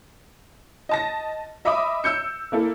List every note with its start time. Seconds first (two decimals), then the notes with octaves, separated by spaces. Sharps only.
0.89 D#5 A5 A#6
1.65 D#5 E5 B5 D6 D#6
2.04 E6 G6 C#7
2.52 A#3 E4 A4